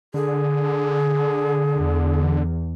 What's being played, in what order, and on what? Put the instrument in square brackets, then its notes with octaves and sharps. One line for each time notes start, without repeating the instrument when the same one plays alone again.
[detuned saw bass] D3 [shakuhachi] G#4
[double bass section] E2